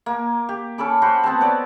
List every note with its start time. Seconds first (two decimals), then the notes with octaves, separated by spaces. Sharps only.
0.06 A#3
0.49 G4
0.78 C#4 A4 B5 D6
1.02 F#4 C5 B5
1.24 B3 C4 C5 A5
1.41 B4 C#5 D5